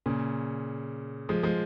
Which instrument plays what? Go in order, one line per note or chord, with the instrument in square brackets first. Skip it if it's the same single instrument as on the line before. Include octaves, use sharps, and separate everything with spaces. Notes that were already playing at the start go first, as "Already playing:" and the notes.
[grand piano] A#2 C#3
F3 G#3
F3 G#3